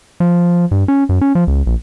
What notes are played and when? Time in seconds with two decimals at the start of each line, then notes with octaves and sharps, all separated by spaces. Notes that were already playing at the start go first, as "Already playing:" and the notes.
0.20 F3
0.71 G2
0.88 C#4
1.09 F#2
1.21 C#4
1.35 F3
1.47 C#2
1.66 A#1